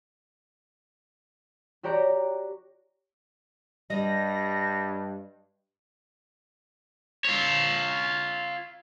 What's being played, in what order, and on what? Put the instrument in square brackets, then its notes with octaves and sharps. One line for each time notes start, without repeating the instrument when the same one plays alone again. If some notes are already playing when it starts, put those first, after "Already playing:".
[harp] F#4 G4 C#5 D5 A#5
[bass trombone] G2 [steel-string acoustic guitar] G3 D#5 [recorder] A#6
[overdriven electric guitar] F4 C#5